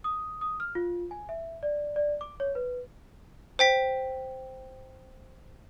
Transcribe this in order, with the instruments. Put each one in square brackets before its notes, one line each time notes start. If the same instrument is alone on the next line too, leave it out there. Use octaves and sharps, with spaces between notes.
[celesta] D#6
D#6
F6
F4
G#5
E5
D5
D5
D6
C#5
B4
[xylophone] C5 G5 B6